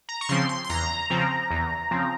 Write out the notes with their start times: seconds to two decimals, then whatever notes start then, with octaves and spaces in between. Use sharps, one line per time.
0.09 A#5
0.21 C#6
0.29 C#3 F3 C4 C6
0.49 C6
0.65 C6
0.69 E2 A#5
1.10 C#3 F3 C4
1.50 E2
1.91 C#3 F3 C4